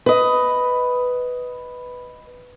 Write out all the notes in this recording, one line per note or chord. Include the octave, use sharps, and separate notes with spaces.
B4 D#5